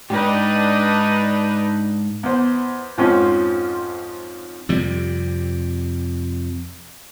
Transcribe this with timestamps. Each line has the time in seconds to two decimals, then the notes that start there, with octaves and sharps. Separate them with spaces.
0.10 G#2 D4 D#4 G4 B4
2.23 E2 C5
2.98 F2 G#2 F3 C4 C#4 F4
4.69 F2 C3 G3